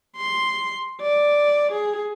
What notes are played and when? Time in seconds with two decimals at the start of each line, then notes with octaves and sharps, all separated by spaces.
0.17 C6
1.01 D5
1.72 G#4